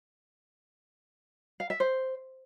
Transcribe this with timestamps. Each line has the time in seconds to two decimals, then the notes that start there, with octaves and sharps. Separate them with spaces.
1.60 F5
1.70 E5
1.80 C5